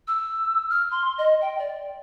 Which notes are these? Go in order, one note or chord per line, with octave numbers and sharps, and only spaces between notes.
E6
F6
C6
D#5
G5
D5